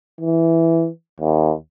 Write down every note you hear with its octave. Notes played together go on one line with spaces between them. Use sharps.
E3
D#2